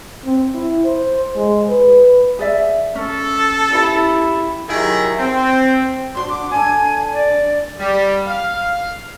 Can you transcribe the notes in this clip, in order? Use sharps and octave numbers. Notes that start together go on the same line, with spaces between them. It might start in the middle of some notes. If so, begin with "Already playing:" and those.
C4
E4
C5
G#3
B4
G#4 D5 E5
C#4 A4
E4 G4
D#3 F#3 E4 G4 G#4
C4
D4 F#4 C6
D6
D4 A4 G#5
D5
G3
F5